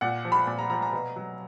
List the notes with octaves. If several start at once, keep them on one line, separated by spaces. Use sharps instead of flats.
A#2 F#5
F3
B5
A#2
A#5
F3 A#5
A#5
B2
F#3